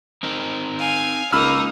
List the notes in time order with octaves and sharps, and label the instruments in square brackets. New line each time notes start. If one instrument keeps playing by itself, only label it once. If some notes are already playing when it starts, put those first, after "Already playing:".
[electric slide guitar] C4 D#4 A#4
[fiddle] F5 G#5
[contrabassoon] C#2 [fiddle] A#3 D#4 [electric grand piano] B5 E6 F6